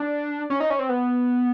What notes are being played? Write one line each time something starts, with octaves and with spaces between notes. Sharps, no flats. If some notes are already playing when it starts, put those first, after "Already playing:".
Already playing: D4
C#4
D#4
C#4
C4
B3